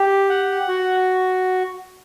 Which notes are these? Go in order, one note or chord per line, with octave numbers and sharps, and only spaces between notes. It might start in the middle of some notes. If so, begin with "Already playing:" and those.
Already playing: G4
F#5
F#4